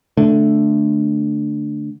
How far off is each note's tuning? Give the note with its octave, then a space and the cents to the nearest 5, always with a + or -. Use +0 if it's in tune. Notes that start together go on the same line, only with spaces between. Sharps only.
D3 +0 A3 +0